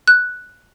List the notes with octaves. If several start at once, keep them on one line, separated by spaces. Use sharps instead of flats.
F#6